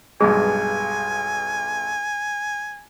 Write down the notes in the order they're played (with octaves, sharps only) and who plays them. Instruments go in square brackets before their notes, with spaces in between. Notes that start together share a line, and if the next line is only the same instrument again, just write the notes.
[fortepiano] B1 G2 G#3 [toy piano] G#4 [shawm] G#5